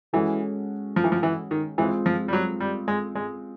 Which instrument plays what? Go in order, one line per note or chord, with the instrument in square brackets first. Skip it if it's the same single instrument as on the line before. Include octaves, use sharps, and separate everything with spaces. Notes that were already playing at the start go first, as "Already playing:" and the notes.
[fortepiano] E3 [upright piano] G#3 C#4 F#4 A4
[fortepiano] F3
E3
F3
E3
D#3
[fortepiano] E3 [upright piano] G#3 C4 F4
[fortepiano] F3
G3
F#3
G3
G#3
G#3